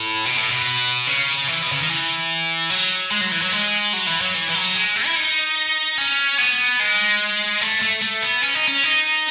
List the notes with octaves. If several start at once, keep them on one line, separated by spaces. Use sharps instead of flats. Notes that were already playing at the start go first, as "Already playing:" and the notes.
Already playing: A2
B2
A2
B2
C#3
E3
B2
C#3
D#3
E3
F#3
G#3
F#3
E3
F#3
G#3
F#3
E3
F#3
E3
E3
F#3
G#3
A3
E4
D#4
C#4
B3
G#3
A3
A3
A3
B3
C#4
D#4
C#4
D#4